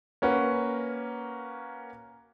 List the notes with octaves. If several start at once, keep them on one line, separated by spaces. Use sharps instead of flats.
A#3 C#4 F#4 B4